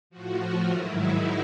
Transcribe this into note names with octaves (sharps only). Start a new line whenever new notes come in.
A2 F3 F#4
F4
G#2 D#3 F#3 E4
D#4